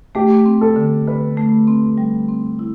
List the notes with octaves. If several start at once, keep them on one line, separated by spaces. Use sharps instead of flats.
A3 G4
C4
A4
D3
D3 B4
A3
C4
G3
C4
E4